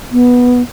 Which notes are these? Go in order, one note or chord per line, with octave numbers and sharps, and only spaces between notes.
B3